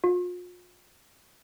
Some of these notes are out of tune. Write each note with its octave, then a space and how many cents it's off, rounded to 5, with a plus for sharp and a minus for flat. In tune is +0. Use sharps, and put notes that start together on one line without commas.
F4 +40